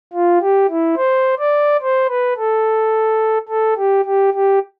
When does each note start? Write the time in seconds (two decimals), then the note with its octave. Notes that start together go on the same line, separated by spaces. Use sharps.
0.13 F4
0.41 G4
0.70 E4
0.97 C5
1.39 D5
1.82 C5
2.09 B4
2.37 A4
3.49 A4
3.77 G4
4.05 G4
4.34 G4